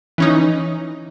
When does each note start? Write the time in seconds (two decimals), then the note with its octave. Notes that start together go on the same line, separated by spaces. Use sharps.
0.18 E3 C#4 D#4